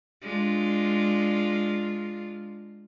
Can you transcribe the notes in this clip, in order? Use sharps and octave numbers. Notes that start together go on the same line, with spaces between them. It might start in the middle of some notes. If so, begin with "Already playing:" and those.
G#3 D4 F4